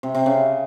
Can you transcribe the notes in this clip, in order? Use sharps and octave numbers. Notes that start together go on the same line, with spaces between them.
C3
C3
C#3